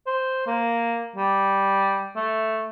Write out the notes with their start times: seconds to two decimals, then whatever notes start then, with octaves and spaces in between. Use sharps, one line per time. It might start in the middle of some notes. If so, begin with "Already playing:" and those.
0.07 C5
0.46 A#3
1.16 G3
2.16 A3